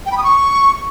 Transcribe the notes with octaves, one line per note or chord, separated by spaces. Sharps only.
G5
B5
D#6
C#6